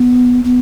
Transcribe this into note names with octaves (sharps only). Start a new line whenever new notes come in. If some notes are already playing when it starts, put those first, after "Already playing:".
Already playing: B3
B3